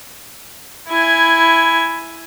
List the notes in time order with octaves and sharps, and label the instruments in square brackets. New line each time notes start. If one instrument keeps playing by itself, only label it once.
[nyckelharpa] E4 G#5